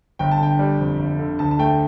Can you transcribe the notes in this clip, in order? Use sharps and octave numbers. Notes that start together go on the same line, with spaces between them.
G1 G5
A5
D3 G5
G3
F2
G1
D3
D2 A5
A5
A3 G5